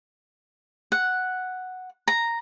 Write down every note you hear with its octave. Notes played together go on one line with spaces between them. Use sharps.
F#5
A#5